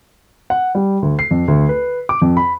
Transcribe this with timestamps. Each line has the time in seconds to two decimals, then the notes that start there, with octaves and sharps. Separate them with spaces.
0.50 F#5
0.75 G3
1.02 D2
1.19 C7
1.31 F2
1.48 D2
1.69 B4
2.09 D6
2.22 F2
2.37 B5